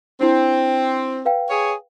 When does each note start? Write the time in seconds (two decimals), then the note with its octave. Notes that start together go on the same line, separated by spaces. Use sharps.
0.21 C4 D4 E4
1.25 B4 F5 G5
1.50 G#4 C#5